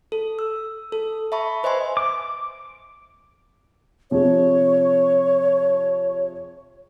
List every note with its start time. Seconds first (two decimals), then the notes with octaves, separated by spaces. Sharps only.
0.12 A4
0.39 E6
0.92 A4
1.32 E5 A5 B5 C#6
1.63 B4 C5 D#5 E5 G#5 C6
1.97 D6
4.11 C3 F3 G#4 C#5